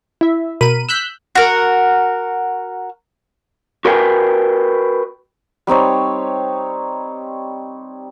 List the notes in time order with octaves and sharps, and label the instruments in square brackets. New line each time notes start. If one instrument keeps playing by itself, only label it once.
[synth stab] E4 E5
B2 A#4 B5 D#7
E6 F#6 G6 B6
[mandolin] F#4 A#4
[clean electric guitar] F#4 A#4 B4 F5 G5 G#5
[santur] G3 C4 D#4 C#5